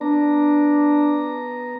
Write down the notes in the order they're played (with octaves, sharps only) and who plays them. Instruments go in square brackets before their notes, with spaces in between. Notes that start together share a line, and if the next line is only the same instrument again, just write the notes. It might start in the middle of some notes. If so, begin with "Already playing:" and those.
[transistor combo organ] B3 A#5 [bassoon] D4